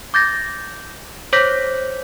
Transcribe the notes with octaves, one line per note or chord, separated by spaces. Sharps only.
D6 G6 A6 A#6
C5 C#5 D6 G6 A#6 B6